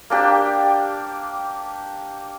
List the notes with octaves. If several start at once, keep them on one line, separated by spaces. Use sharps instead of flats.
A#3 D4 G4